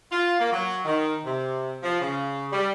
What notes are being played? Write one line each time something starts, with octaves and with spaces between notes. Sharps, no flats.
F4
A#3
F#3
D#3
C3
F3
C#3
G3